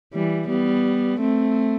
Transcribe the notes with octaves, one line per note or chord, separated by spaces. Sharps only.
E3 G3
G3 B3
A3 C4